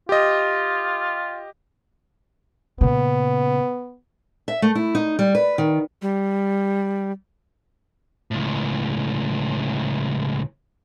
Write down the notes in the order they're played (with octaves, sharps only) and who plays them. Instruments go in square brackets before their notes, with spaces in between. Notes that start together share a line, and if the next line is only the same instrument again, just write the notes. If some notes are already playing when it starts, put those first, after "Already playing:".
[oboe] F4 [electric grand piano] G4 D#5
[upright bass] A#2 C#3 [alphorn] B3
[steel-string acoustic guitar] E5
A3
E4
D#4
G3
B4
D#3
[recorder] G3
[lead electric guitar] C#2 A2